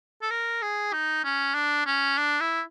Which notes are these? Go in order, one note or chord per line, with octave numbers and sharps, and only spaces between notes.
A4
A#4
G#4
D#4
C#4
D4
C#4
D4
E4